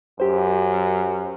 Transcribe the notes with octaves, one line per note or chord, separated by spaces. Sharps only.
F#2 G4 C5